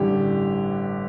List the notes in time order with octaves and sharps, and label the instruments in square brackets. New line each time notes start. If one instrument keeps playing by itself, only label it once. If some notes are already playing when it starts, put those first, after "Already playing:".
Already playing: [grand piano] A1 G2 D3 G4